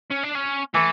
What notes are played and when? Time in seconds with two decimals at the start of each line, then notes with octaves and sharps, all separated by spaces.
0.10 C#4
0.23 D4
0.35 C#4
0.74 E3 A3